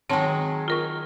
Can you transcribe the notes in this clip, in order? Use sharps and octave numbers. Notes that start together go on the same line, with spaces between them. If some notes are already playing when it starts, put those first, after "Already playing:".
D#3 F#3 G#3 C4 C#5 A5
F4 A#4 C#6